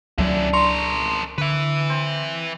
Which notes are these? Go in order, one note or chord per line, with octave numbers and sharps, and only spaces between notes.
C#2 D3 F#3 C#4 E4
D4 A#4 C6 C#6
D3 B4 E5
C4